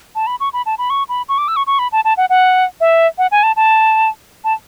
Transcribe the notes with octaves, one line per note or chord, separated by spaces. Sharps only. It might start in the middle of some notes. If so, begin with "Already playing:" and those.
A5
B5
C#6
B5
A5
B5
C#6
B5
C#6
D6
E6
C#6
C#6
B5
A5
A5
F#5
F#5
E5
F#5
G#5
A5
A5
A5